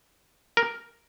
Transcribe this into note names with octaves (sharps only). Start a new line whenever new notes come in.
A#4